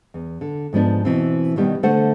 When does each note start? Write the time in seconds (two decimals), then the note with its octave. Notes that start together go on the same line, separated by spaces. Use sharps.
0.14 E2
0.41 D3
0.73 G#2 F3 B3 D4
1.05 B2 E3 C4
1.56 B2 D#3 G3 B3
1.83 D3 A3 C5 F#5